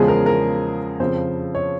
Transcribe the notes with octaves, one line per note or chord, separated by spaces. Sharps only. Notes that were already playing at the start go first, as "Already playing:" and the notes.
Already playing: E2 C#3 F3 G#3 G#4
A#4
A#4
F2 C#3 F3 C5
C#5